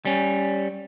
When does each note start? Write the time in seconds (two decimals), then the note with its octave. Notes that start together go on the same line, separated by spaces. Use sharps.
0.05 G3 C#4